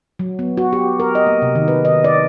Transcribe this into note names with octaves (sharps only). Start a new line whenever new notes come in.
F#3
B3
F#4
G4
A#4
D#5
A#3
C3
D#3
B4
D#5
D5